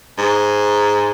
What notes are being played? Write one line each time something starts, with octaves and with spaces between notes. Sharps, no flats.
G#2